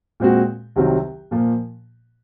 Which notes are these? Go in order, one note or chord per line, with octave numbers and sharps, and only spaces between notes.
A#2 G#3 C4 F#4
C2 C3 D#3 F#3 C4
A#2 F3 A#3